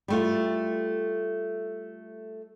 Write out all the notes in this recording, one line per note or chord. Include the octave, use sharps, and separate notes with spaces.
G3 A3 F4